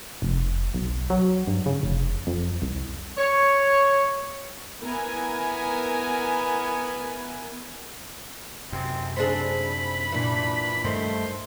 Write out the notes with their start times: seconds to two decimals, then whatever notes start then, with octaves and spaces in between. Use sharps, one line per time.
0.22 F1
0.74 B1
1.10 F#3
1.47 G2
1.66 C#3
1.83 F1
2.27 F2
2.62 C2
3.17 C#5
4.83 B3 E4 A#4 G#5
8.72 F#2 C3 C4
9.16 C4 D4 G#4 B5
10.12 A#2 E3 D4
10.84 G2 D#3 G3 A3 C5